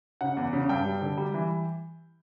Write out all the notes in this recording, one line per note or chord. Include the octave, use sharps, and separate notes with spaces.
C#3 F#5
E2
C#3
G2 G5
G3
D3
G3
E3